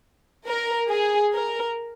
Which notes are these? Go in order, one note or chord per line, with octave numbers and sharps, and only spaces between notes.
A#4
G#4
A#4